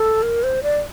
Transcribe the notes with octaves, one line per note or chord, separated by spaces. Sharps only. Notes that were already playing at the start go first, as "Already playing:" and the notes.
Already playing: A4
A#4
C5
D5